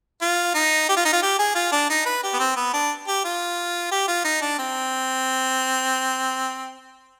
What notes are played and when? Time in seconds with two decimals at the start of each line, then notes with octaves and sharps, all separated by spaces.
0.21 F4
0.54 D#4
0.89 G4
0.96 F4
1.05 D#4
1.13 F4
1.22 G4
1.39 G#4
1.55 F4
1.72 D4
1.90 D#4
2.05 B4
2.23 G4
2.33 B3
2.39 C4
2.56 B3
2.73 D4
3.07 G4
3.24 F4
3.91 G4
4.07 F4
4.24 D#4
4.41 D4
4.58 C4